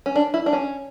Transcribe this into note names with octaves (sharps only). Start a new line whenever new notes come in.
C#4
D4
E4
D4
C#4